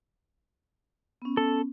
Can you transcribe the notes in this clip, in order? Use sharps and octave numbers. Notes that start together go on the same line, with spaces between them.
B3 C#4
A4